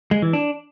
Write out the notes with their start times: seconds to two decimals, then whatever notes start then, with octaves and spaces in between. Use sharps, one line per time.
0.11 G#3
0.22 E3
0.33 D4